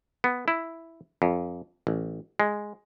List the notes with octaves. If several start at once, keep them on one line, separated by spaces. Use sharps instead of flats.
B3
E4
F2
A1
G#3